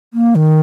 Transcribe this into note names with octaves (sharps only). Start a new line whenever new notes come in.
A#3
D#3